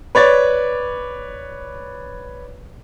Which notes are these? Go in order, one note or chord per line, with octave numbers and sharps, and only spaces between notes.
B4 C#5 D5 A6